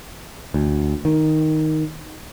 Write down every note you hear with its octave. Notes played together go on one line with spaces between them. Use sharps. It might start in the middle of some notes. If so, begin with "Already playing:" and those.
D2
D#3